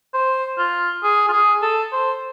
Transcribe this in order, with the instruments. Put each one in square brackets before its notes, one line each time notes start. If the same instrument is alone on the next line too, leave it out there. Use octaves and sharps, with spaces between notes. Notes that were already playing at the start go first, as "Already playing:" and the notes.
[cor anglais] C5
F4
G#4
F4
G#4
A4
C5